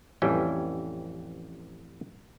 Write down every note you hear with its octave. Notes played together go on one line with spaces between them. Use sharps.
A1 F2 E3 G3 C#4 G5